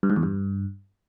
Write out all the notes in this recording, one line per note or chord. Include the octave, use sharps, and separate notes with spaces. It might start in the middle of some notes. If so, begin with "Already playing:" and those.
G2
G#2
E2
G2